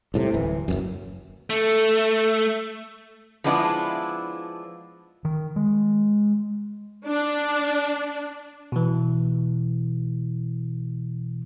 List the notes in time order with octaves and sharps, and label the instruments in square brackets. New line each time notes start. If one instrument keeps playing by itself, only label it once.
[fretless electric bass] C2 A2 C3
D1 E3
F#1 B1 F#2
[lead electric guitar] A3
[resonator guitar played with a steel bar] F3 G#3 B3 D4 E4
[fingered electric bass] D#3
G#3
[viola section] D4
[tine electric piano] B2 E3